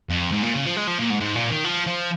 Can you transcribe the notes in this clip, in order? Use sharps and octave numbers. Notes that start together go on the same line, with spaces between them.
F2
G#2
A#2
C#3
F3
G#3
F3
A#2
G#2
G#2
A#2
D#3
F3
F3